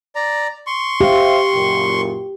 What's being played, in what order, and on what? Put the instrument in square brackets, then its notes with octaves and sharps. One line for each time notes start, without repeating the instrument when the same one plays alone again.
[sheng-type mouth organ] D5 A#5
C6 C#6
[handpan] G4 [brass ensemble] C5 E5 F5
[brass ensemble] F#1 A#2